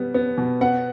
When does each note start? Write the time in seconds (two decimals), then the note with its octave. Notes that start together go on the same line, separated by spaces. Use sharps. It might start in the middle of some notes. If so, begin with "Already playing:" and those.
Already playing: B2 G3 B3
0.14 B3
0.38 B2
0.61 B3 F#5